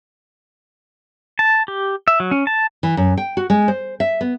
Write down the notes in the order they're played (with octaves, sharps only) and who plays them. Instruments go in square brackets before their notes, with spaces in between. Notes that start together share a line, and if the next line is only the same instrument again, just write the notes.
[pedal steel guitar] A5
G4
E5
F#3
C#4
A5
[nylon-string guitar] E3
F#2
G5
F#4
G#3
C5
E5
B3